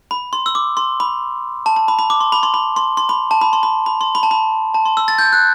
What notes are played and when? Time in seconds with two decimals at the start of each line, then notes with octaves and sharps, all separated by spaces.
0.11 B5
0.33 C6
0.46 E6
0.55 D6
0.77 C6
1.00 B5
1.66 A5
1.76 A5
1.88 B5
1.99 B5
2.10 D6
2.20 C6
2.32 B5
2.43 C6
2.54 B5
2.76 C6
2.97 C6
3.09 B5
3.31 A5
3.41 B5
3.53 C6
3.63 B5
3.86 B5
4.01 C6
4.15 B5
4.23 A5
4.31 B5
4.74 A5
4.86 C6
4.97 E6
5.08 A6
5.18 G6
5.33 F#6